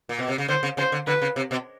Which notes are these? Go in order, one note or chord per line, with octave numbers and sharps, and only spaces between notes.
A#2
B2
C3
C#3
D3 C5
C#3
C#3 C5
D3
D3 B4
C#3
C3
B2